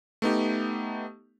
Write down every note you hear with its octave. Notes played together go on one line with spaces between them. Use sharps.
A3 B3 D#4 G4